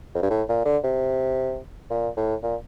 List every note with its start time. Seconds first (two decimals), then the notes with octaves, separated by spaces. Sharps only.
0.15 F2
0.22 G2
0.30 A2
0.48 A#2
0.65 D3
0.84 C3
1.90 A#2
2.16 A2
2.43 A#2